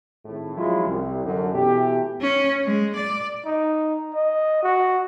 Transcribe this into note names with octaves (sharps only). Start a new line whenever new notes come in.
G#1 A2
F3 F#3 G#3 C#4 E4 F4
C2
F#2 D3
B2 E3 A3 G4
C#4
G#3
D5
D#4
D#5
F#4